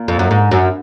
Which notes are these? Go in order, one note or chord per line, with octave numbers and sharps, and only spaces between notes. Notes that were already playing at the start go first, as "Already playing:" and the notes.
Already playing: A#2
F2
F#2
G#2
F#2